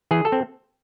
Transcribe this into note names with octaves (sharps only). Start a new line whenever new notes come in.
E3 G#4
A4
C4